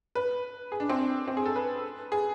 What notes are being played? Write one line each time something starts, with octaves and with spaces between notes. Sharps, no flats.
B4
G#4
D4
C4
C4
G#4
A4
B4
G#4